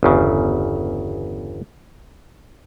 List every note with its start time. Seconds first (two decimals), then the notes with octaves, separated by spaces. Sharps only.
0.03 G1 E2 C#3